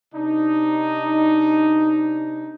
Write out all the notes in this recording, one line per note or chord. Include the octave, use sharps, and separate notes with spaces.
C3 D4 D#4